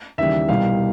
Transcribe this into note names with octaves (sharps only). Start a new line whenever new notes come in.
D#2 C#3 E3 G3 E5
C2 B2 G3 F5